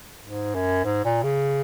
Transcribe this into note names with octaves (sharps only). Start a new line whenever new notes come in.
G#2
F#2
G#2
A#2
C#3